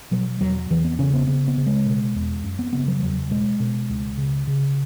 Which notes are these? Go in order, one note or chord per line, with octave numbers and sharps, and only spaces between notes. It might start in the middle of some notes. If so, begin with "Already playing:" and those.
B2 F#3
E2 F#3
E2 E3
B3
C#3 C#4
B3
C#3 B3
B3
C#3
G#3
B2
E2
F#2
B3
C#3 B3
F#3
E2 F#3
B2 G#3
B2
C#2
C#3
C#3